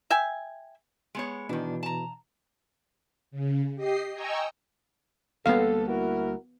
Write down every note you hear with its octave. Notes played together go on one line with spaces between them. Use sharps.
E5 G5 G#5
G#3 B3 C#5
B2 D#3 E3 D4
A5 A#5
C#3
G4 D#5 C7
D#5 G5 G#5 A#5 C#6 E6
D2 G3 A#3 B3 A4 F5
E4 F#4 A#4